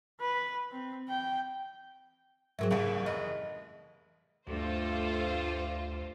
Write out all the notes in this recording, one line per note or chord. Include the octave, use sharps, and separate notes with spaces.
B4
C4
G5
G#2 F#3 C4 G#4 A#4 E5
F#1 C2 G2 C#3 E3
F1 D#5
D2 G2 A3 F4 A4 C5